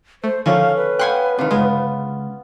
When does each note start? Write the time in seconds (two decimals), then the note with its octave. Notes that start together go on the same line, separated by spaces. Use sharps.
0.24 A3 C5
0.46 D3 D#3 F3 A3 C#4 F5
0.76 B4
0.99 B3 F5 G5 G#5 C6 F#6
1.38 C3 D#3 F4
1.51 G1 C#2 G#3 B3